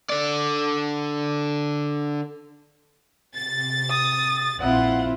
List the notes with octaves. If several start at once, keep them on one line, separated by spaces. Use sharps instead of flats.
D3 D5
C3 A6
D#6
A#1 C4 E4 F4 F#5